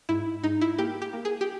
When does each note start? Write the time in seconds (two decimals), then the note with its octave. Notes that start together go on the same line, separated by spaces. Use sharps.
0.09 G#2 E4
0.43 G#2 D#4
0.61 E4
0.78 A#3 G4
1.02 G4
1.13 A#3
1.25 G#4
1.41 G4